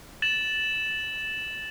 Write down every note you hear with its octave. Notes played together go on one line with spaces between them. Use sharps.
A6 E7 F#7